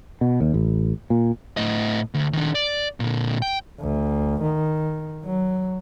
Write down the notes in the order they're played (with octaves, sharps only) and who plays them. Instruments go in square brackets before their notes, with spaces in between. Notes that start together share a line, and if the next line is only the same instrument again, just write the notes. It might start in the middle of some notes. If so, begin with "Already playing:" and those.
[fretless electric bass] B2
D#2
A1
A#2
[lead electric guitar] A2 D#5
D2
D#3 D4
D5
A#2 D3
G5
[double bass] D2
D#3
F#3